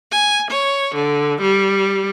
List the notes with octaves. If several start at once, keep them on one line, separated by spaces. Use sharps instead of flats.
G#5
C#5
D3
G3